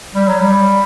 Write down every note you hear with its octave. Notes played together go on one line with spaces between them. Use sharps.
G3
F#3
G3